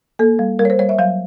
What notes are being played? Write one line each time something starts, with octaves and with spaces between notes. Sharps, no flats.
A#3 A4
G3
G3 A#4
C#5
C5
G3 C#5
E5
F#3 F5